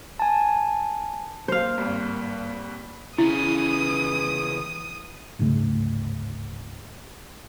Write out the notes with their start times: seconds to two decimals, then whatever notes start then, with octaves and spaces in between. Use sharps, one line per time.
0.20 G#5 A5
1.48 A#3 C5 F5
1.78 G#1 G2
3.18 C#3 E3 E4 D#6
5.39 D1 G#2 C#3 A3